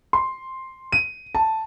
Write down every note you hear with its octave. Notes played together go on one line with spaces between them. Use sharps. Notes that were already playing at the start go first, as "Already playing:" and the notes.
C6
D#7
A5